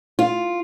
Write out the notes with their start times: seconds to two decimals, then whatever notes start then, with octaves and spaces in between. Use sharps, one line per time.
0.19 F4